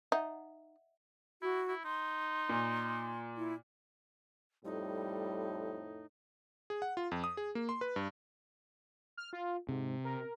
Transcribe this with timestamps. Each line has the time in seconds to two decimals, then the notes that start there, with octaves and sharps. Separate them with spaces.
0.12 D#4 D#5 E5 F#5
1.42 E4 F#4
1.68 E4
1.84 D#4 C6
2.49 A#2
3.37 E4
4.65 F2 A2 G3 D#4
6.70 G#4
6.82 F#5
6.97 F4
7.11 F2
7.24 D#6
7.37 G#4
7.55 A#3
7.69 C6
7.81 B4
7.96 G2
9.17 F6
9.33 F4
9.69 G#2 C3
10.05 A#4